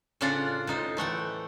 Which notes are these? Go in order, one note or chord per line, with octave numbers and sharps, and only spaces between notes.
A2 C#3 D4 F4 D5 F#5
A2 D#4 C5
E3 A3 F#5 G5